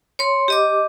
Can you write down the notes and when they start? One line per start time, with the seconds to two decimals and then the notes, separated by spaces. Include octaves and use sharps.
0.19 C#5 C6
0.48 G4 D#5 D6